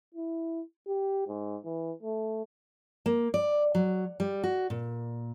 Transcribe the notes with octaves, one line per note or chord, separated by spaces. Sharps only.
E4
G4
G#2
E3
A3
A#3
D5
F#3
G3
F#4
A#2